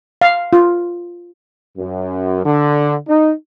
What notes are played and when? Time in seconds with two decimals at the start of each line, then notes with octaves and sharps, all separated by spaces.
0.21 F5
0.53 F4
1.78 F#2
2.45 D3
3.08 D#4